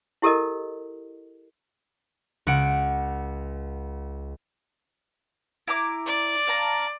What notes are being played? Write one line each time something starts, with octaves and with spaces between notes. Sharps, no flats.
E4 G4 A4 A#4 D#5
C#2 F#5 C#7 D7
E4 A#5 D6
D5
F5 A5 A#5